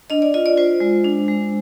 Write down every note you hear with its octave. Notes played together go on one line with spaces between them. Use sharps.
D4 D#5
D5
F4 D#5
D5
F4 C5
G#3
D4
G#3